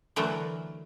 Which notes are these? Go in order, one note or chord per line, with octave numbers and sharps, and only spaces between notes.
D3 E3 F#3 A3 A#4